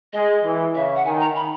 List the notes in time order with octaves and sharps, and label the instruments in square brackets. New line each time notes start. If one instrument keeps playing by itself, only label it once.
[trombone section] G#3 [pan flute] D#5
[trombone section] E3
[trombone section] C#3 [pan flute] E5
[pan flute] F#5
[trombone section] D#3 [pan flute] G#5
[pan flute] A#5
B5